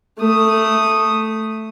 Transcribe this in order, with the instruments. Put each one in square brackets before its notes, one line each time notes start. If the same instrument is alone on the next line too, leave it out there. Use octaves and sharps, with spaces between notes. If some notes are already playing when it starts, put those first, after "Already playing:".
[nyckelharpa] A3 D#6